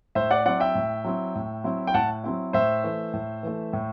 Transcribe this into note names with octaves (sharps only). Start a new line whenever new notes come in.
A2 C5 E5
D5 F#5
F#3 C4 E4 D5 F#5
E5 G5
A2
F#3 C4 E4
A2
F#3 C4 E4
G5
A2 F#5 A5
F#3 C4 E4
A2 C5 E5
E3 A3
A2
E3 A3
A2